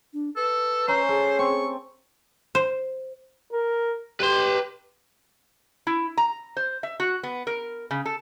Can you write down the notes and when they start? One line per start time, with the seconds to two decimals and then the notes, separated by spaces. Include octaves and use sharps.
0.13 D4
0.36 A4 B4
0.88 C#4 C5 A#5
1.09 G#4 A4
1.39 C4 C#6
2.55 C5
3.52 A#4
4.20 G4 B4 C6
5.87 E4
6.17 A#5
6.57 C5
6.83 E5
7.00 F#4
7.23 B3
7.47 A#4
7.91 C#3
8.06 A4